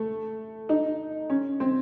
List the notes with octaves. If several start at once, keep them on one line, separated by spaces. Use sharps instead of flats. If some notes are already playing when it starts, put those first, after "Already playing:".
Already playing: A3
D#4
C#4
C4